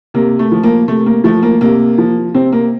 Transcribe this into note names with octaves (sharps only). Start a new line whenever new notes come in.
C3 A#3
A3
F3
A#3
C3 A3
A#3
F3 A3
A#3
C3 A#3
F3
C3 C4
A#3